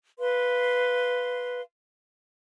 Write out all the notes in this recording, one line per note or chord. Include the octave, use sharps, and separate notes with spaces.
B4 F5 C6